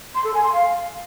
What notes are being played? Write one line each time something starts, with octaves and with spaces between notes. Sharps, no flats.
C6
A4
G#5
C6
F5